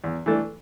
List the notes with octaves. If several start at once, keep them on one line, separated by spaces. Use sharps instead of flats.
E2
E3 A3 D4